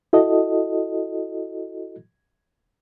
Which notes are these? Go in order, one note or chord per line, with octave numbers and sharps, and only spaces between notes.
E4 F#4 A4 D#5